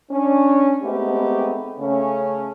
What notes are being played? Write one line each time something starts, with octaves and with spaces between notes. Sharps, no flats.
C#4 D4
G#3 A3 B3 C4 D#4 G4
C#3 A3 C#4